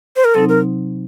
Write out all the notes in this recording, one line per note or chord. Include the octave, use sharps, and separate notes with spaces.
C5
A#4
C3 F#3 C4 D#4 A4
A#4